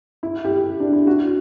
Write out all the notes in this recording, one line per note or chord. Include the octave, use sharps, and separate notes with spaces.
E4
G4
D4
E4
F#4